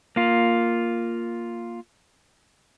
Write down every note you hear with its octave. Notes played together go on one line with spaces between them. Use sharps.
A#3 F4